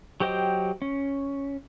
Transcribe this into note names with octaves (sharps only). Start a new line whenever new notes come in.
F#3 G4 C5 D#5 G5
C#4